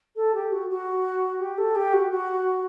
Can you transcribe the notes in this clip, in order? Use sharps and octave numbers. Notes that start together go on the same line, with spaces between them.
A4
G4
F#4
F#4
G4
A4
G4
F#4
F#4